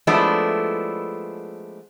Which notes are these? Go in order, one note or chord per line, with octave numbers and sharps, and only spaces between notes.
F3 G#3 A3 B3 D4 E4